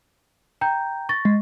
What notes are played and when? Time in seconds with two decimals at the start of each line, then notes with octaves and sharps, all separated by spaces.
0.61 G5 A#5 G6
1.09 C#6 A6 A#6
1.25 G#3